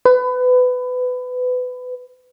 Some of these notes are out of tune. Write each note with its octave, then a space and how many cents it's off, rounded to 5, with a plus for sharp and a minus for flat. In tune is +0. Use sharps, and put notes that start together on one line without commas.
B4 +25